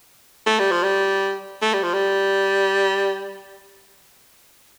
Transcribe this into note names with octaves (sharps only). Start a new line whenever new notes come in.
A3
G3
F3
G3
A3
G3
F3
G3